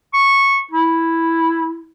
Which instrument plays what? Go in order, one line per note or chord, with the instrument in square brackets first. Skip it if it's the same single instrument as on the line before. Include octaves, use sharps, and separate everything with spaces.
[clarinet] C#6
E4